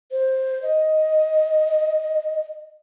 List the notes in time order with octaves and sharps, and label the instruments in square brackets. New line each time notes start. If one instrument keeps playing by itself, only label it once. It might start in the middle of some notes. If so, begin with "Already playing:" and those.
[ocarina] C5
D#5